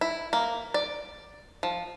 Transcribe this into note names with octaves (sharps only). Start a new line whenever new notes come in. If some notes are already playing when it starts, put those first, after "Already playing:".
E4
A#3
D5
F3